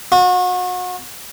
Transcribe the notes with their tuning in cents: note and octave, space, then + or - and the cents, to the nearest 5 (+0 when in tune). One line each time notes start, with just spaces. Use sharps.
F#4 -35